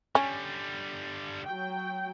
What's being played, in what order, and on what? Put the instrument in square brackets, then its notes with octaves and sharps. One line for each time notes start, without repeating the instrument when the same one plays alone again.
[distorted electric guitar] D3 G3 [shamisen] C#4
[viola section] F#3 G5